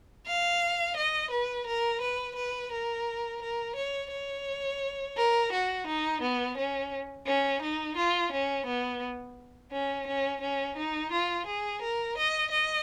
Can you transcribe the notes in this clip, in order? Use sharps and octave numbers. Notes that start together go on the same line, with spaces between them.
F5
D#5
B4
A#4
B4
B4
A#4
A#4
C#5
C#5
A#4
F#4
D#4
B3
C#4
C#4
D#4
F4
C#4
B3
C#4
C#4
C#4
D#4
F4
G#4
A#4
D#5
D#5